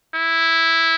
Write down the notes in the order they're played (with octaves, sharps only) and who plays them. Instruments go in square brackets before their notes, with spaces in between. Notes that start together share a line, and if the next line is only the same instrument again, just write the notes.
[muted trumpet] E4